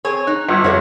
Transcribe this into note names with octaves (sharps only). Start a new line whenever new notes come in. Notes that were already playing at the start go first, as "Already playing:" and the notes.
C4 G#4 C#5
D#4 F#6
G1 D#5 E6 G#6
F2 B2 G3 F#4 A4 C#5 E5